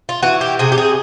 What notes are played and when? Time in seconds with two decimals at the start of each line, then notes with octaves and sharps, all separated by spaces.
0.09 F4
0.22 E3 F#4
0.41 G4
0.59 C3 G#4
0.72 G4
0.78 G#4